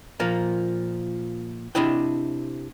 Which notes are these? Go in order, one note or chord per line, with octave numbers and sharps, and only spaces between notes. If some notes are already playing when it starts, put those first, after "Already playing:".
A#2 F3 A#3
C3 D4 E4 D#5 G5